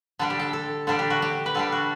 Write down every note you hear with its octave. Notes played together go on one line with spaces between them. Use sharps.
D3 G3 D4 A4
G4
A4
A4
D3 G3 D4 A4
G4
F#4
G4
B4
D3 G3 D4 A4
F#4